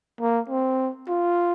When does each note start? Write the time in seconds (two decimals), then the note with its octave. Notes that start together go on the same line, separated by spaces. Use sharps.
0.20 A#3
0.50 C4
1.08 F4